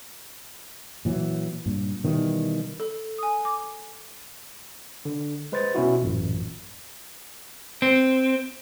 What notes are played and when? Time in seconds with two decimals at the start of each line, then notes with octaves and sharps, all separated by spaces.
1.05 A#2 E3 F#3
1.66 G2 A#2
2.04 B2 D#3 E3 G3
2.80 A4
3.18 G#5 D#6
3.45 D6
5.05 D3
5.52 G#3 B4 C5 A6
5.75 B2 C#4 E4 F#4
6.02 A1 F#2 A#2
7.82 C4